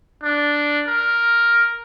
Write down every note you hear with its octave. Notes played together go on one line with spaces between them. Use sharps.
D4
A#4